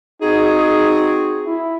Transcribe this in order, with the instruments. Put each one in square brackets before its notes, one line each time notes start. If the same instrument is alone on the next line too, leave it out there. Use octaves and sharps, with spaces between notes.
[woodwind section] C4 F#4 G#4 [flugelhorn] D#4
[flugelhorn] E4